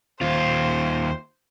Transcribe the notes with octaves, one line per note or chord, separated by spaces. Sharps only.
D#2 F4 C5